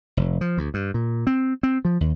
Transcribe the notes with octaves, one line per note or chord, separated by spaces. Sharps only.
F1
F3
D2
G2
A#2
C4
C4
F3
D#2